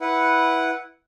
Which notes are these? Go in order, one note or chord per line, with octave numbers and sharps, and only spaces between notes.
E4 B4 F#5